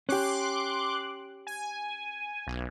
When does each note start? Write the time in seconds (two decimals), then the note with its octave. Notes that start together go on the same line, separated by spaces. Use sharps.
0.09 C#4 G4 C6 D6 F#6
1.47 G#5
2.47 B1